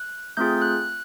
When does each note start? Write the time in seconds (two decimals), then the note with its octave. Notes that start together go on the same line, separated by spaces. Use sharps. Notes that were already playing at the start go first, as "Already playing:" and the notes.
Already playing: F#6
0.37 A3 C4 F4 G#4 G6
0.62 F#6